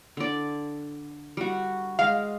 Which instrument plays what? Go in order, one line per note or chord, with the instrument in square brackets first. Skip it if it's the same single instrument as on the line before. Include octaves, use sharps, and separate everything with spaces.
[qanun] D3 D5
G3 F#4
[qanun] G#3 [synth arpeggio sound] F5